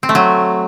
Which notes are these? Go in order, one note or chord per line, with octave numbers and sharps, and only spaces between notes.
C4
A3
F#3